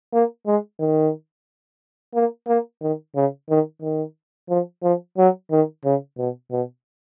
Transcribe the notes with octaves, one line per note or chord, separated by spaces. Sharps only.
A#3
G#3
D#3
A#3
A#3
D#3
C#3
D#3
D#3
F3
F3
F#3
D#3
C#3
B2
B2